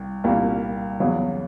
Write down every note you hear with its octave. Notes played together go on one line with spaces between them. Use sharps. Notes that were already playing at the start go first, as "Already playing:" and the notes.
Already playing: C2
C2 A#2 G3 A#3
E2 C#3 F#3